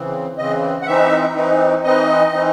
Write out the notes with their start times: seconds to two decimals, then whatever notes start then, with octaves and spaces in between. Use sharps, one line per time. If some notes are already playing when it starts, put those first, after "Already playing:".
Already playing: C#3 E3 C4
0.38 C#3 E3 C4 D#5
0.82 F#5
0.86 E3 C4 D#4 E5
1.35 E3 C4 D#4
1.84 E3 C4 D#4 D#5
2.33 E3 C4 D#4